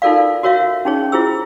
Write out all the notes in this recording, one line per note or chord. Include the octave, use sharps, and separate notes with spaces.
D#4 F4 A4 A#4 D5 F5
F#4 A#4 C#5 E5 F5
C#4 D#4 G#4 C#5
E4 F4 G#4 C5 E6